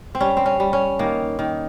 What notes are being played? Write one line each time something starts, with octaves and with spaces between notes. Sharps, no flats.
C4
G3 C#4
C4
C#4
G3
C#4
D#3 A#3
D#3